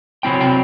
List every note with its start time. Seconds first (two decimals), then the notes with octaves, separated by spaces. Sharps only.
0.23 C3 F#3 C4 E4 G5
0.41 G5